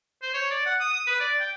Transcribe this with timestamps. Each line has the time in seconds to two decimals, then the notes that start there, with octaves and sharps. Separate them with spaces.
0.22 C5
0.34 C#5
0.50 D5
0.66 F#5
0.80 D#6
0.93 D#6
1.07 B4
1.20 D5
1.40 G5